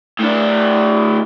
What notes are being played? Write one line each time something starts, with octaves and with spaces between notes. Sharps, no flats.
A2 D4